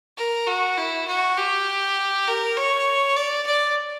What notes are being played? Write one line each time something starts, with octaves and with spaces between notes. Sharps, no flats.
A#4
F#4
E4
F#4
G4
A#4
C#5
D5
D5